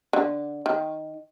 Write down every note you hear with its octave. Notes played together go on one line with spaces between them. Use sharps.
D3
D#3